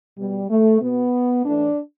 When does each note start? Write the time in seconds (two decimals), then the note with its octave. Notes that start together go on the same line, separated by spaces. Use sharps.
0.18 B2 G3
0.50 A3
0.82 B2 B3
1.45 A2 E3 D4